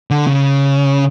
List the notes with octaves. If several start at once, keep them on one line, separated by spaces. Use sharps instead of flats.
D3
C#3